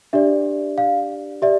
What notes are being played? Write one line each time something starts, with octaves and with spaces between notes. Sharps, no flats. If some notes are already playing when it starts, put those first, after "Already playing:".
D4 G4 D5 E5
F5
G4 D5 E5